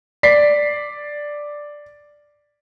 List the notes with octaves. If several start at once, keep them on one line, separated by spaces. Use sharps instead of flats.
D5 B6 C7